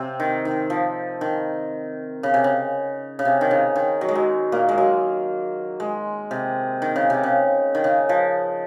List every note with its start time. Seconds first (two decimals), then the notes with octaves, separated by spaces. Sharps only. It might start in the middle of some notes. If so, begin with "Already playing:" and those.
Already playing: C3 C4
0.20 D#3
0.45 D#3
0.70 F3
1.21 D#3
2.23 C#3
2.34 C3
2.44 C#3
3.19 C#3
3.25 C3
3.41 D#3
3.51 C#3
3.76 D#3
4.01 F#3
4.09 G#3
4.15 F#3
4.52 A#2 A#3
4.69 G#3
4.78 F#3
5.80 G#3
6.31 C3
6.82 D#3
6.96 C#3
7.10 C3
7.23 C#3
7.75 D#3
7.84 C#3
8.09 F3